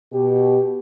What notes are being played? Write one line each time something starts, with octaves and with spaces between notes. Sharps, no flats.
B2 G4